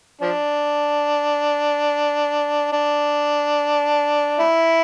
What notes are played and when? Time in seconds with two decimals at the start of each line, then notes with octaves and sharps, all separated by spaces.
0.22 F3 D4
2.73 D4
4.39 E4